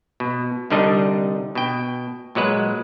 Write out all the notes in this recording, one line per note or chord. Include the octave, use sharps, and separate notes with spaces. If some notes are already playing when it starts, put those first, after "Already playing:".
B2
C2 D3 G3 D4 D#4 D#5
B2 G5
A#2 F#3 G#3 B4